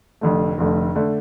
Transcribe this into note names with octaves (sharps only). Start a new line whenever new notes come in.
F1 F2 D3 A3
F1 F2 D3 A3
D3 A3